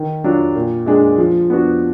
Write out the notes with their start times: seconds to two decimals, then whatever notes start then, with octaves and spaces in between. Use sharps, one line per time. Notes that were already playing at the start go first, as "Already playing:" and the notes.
Already playing: D#3
0.24 F#3 D4 F4
0.56 A#2
0.86 G#3 D4 G#4
1.18 F3
1.50 B3 D4 F#4